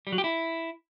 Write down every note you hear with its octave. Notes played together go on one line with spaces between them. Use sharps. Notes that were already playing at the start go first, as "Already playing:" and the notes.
G3
F#3
G4
E4